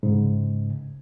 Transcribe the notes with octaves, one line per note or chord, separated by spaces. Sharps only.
G#2 C#3